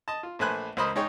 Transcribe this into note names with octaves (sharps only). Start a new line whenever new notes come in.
D#5 A5
F4
A#1 A3 B4 C5 G#5 F#6
C#2 A#4 C5 D#5 B5 D#6
G#2 D#4 G#4 C#5 G5